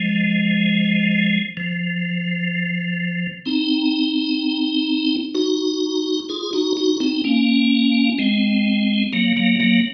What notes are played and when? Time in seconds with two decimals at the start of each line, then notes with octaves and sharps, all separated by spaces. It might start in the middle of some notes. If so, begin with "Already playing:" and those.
Already playing: F3 G#3
1.57 F3
3.46 C4 D#4
5.35 D#4 F#4
6.29 F4 G#4
6.53 D#4 F#4
6.77 D#4 F#4
7.00 C4 D#4
7.24 A#3 C#4
8.18 G#3 C4
9.13 F#3 A#3
9.36 F#3 A#3
9.60 F#3 A#3